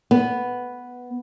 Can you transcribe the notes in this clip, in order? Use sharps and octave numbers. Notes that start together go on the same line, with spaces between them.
B3